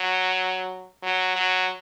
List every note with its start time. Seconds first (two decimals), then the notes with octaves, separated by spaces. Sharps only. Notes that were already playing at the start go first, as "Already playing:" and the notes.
Already playing: F#3
1.03 F#3
1.36 F#3